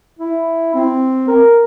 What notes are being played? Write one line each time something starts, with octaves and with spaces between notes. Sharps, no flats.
E4
C4
A#4